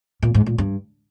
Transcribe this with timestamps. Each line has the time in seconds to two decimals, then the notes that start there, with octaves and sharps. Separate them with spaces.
0.23 A#2
0.34 G#2
0.46 A#2
0.58 G2